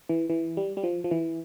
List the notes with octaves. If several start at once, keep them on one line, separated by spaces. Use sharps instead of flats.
E3
E3
G3
G3
F3
F3
E3